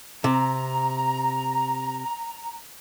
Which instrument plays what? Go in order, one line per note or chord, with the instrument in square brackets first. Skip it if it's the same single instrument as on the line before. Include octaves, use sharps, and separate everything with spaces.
[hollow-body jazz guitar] C3 [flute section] A#5